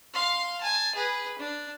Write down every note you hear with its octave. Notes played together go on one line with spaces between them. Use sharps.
F5 C6
G#5 A5
G#4 B4
D4